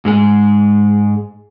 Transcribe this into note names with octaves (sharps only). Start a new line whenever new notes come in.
G#2 G#3 G#4